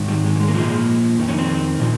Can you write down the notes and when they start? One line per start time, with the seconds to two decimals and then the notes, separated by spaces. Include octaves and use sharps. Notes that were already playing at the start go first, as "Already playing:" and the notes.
Already playing: G#2 D#3
0.08 G3
0.25 G#3
0.36 G3
0.40 G#3
0.48 A#3
0.55 A#2 F3 G#3
1.17 F2 D#3
1.28 C#4
1.38 C4
1.80 A#2 F3